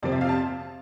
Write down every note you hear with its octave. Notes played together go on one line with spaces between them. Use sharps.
F2 C3 F3 C4 D5
E5
F5
A5